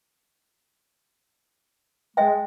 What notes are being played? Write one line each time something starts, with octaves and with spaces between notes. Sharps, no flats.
G#3 D#5 E5 G5